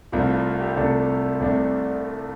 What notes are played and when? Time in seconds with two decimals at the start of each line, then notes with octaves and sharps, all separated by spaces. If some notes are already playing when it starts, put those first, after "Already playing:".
0.12 C2 C3 A3 D4 F4
0.29 F4
0.61 G4
0.76 C2 C3 A3 D4 A4
1.40 C2 C3 A3 D4